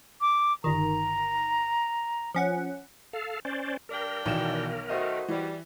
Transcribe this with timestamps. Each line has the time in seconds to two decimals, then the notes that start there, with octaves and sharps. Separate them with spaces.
0.21 D6
0.64 G1 D#3 A#5
2.35 F3 C#4 F#5
3.13 A4 F5
3.45 C#4 C5 D5
3.89 G2 D4 A#4 G5
4.26 B1 B2 D#3 E3 E7
4.89 D#3 A3 F#4 C5 D#5
5.28 E3 G3